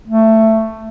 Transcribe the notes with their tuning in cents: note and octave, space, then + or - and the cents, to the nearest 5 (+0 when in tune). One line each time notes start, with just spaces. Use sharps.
A3 +10